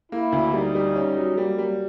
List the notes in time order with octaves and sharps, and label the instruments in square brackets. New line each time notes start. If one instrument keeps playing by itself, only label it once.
[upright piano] A#3 [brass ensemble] E4
[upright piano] D2
[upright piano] G3 [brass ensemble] D#4
[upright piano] G3
C#4
F#3
[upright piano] G3 [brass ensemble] A#3
[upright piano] G3